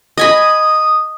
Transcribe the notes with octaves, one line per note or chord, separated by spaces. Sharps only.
D#5 G#5 B5 D#6